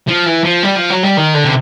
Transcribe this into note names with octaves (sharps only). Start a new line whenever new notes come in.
F3
E3
F3
G3
F3
F#3
G3
D#3
D3
C3